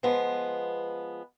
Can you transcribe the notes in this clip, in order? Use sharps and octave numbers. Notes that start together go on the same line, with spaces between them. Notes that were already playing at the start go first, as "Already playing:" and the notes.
F3 G#3 B3